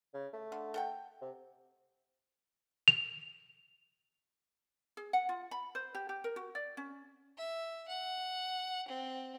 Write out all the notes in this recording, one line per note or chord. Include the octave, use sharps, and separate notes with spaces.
C#3
A3
D3
A4 F#5 G5
C3
F7
G#4
F#5
F4
B5
C5
G4
G4
A#4
F#4
D5
C#4
E5
F#5
C4